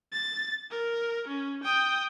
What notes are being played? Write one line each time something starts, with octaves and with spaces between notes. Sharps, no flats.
A6
A#4
C#4
G5 D#6